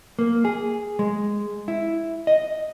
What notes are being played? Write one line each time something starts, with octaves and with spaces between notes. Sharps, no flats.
A#3
G#4
G#3
E4
D#5